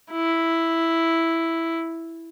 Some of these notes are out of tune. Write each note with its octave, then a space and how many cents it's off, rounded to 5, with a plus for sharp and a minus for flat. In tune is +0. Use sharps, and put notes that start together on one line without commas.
E4 +0